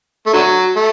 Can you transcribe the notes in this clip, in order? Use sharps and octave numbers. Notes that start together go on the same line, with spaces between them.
A3
D3 F#3
A3